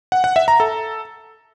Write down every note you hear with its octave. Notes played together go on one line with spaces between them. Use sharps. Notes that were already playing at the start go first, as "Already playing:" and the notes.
F#5
F#5
E5
A#5
A4